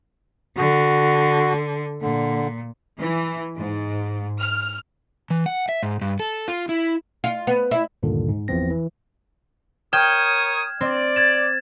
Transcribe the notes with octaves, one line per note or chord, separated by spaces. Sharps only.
D3 F#4
A#2 D3
E3
G#2
F6
E3
F#5
E5
G#2
G2
A4
F4
E4
F4
B3
E4
D2 G2 A#2 D3 D#3
G#2
G1 E2 E3 F3 C4 A#6
E3
A#4 C#5 G5 D#6 F6 G#6 E7
C4 D5
G#6 A6 E7